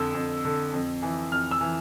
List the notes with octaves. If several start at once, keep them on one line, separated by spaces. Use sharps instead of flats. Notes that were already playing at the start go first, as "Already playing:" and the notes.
Already playing: F2 D3 E6
F2
D3
F2
E3
F2 F6
E6
E3